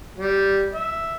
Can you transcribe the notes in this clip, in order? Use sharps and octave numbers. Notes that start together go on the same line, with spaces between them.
G3
E5